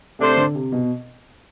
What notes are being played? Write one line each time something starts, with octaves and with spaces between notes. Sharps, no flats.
C3 A3 D4 A4 C5
D3
C3
B2